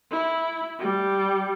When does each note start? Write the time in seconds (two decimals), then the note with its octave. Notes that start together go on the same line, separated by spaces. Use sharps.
0.11 E4
0.79 G3